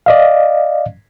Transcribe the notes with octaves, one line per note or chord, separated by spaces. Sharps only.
D5 D#5 F5